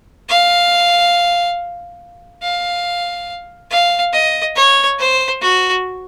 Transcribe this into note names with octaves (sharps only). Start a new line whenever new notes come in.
F5
F5
F5
D#5
C#5
C5
F#4